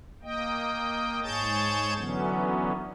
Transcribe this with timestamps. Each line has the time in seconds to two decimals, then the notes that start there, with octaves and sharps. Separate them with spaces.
0.23 A#3 D#5 G5
1.23 G#2 G#4 C#5 A5 G6 A6
1.97 D3 E3 F#3 B3 C#4